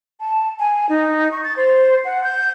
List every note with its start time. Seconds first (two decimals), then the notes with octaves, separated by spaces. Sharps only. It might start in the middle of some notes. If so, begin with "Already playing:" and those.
0.20 A5
0.59 G#5
0.89 D#4
1.31 C#6
1.44 A6
1.57 C5
2.05 F#5
2.24 G6